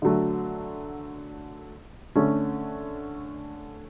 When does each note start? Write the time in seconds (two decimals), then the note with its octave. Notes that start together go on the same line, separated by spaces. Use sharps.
0.02 D3 F#3 A3
2.16 D3 A3 C#4